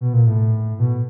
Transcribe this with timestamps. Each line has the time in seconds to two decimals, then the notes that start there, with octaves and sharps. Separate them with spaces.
0.01 B2
0.13 A#2
0.26 A2
0.79 B2